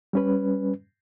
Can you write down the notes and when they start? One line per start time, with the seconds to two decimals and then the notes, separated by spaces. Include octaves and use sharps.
0.13 G3 C#4 B4